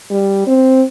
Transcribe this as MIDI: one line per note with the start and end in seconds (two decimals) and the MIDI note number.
0.10 0.44 55
0.47 0.83 60